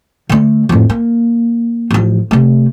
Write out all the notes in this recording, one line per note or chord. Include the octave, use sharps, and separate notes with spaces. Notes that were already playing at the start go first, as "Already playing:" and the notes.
D3 A3
F2 A2
A#3
A1 F3
C3 A3